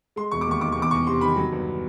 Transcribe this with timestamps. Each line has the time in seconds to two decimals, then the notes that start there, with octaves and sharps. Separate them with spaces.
0.16 G#3 C6
0.31 E1 C#6
0.41 D6
0.47 D#2 C#6
0.61 D#3 D6
0.72 E2 C#6
0.82 D6
0.91 E2 C#6
1.06 C3 C6
1.21 D#3 B5
1.36 F#3
1.52 G1